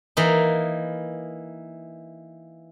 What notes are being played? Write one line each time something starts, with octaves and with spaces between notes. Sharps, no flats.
E3 A#3 D#4